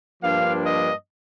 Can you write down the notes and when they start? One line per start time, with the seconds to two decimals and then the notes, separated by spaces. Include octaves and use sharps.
0.23 G2 F3 A#3 D4 F5
0.65 D#5